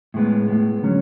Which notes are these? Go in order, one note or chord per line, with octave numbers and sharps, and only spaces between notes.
A2 G#3 B3
A2 G#3 B3
D3 F#3 C#4